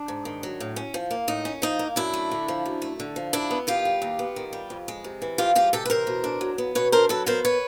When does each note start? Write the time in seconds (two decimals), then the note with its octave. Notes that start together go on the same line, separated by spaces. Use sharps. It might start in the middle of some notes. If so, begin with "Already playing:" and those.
Already playing: D4
0.08 G#2
0.25 D#3
0.43 F#3
0.60 A2
0.76 C#4
0.94 F3
1.11 A#3
1.28 A2 D#4
1.45 C#4
1.62 F3 D#4
1.79 A#3
1.96 F#2 D4 E4
2.13 A3
2.31 D3
2.48 F3
2.65 F#2
2.82 A3
3.00 D3
3.16 F3
3.33 D#2 D4 E4
3.51 B3
3.67 D#3 F4 G4
3.85 G3
4.02 D#2
4.19 B3
4.36 D#3
4.53 G3
4.70 F2
4.88 G#3
5.04 C3
5.22 E3
5.38 F2 F4 G4
5.55 G#3 F4 G4
5.73 C3 G4 A4
5.86 B4
5.90 E3 A#4 C5
6.07 B2
6.24 D4
6.41 F#3
6.58 B3
6.75 B2 B4 C#5
6.92 D4 A#4 C5
7.09 F#3 A4 B4
7.26 B3 A#4 C5
7.45 B4 C#5